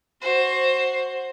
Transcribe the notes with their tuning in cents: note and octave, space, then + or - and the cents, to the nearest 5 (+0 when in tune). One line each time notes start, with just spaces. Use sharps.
F#4 +0 C5 +15